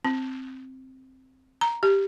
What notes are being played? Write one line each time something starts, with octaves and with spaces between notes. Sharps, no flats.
C4
A#5
G4